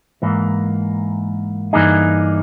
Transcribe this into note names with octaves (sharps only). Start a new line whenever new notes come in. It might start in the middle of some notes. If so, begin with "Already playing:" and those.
G#2 E3 A#3
G2 E3 A#3 D#4 G#4